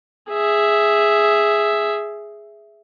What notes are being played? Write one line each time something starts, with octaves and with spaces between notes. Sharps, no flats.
G#4 E5